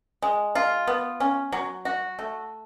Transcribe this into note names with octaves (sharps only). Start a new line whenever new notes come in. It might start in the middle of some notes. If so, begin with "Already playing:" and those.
G#3
F4
B3
C#4
F#3
F#4
A3